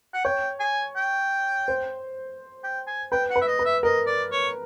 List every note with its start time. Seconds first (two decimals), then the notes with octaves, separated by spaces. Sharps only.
0.13 F#5
0.25 C#5 G5
0.60 G#5
0.96 G5
1.68 C5
2.64 G5
2.87 G#5
3.12 B4 G5
3.30 F#5
3.36 B4
3.42 E5
3.48 D#5
3.59 B4
3.65 E5
3.83 A#4 D#5
4.07 D5
4.32 C#5